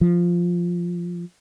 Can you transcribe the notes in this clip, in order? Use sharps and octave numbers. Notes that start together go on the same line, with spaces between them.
F3